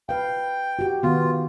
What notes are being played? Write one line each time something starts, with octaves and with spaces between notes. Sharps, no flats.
B4 F5 G5
F#4 G4
D#3 B3 F4 F#4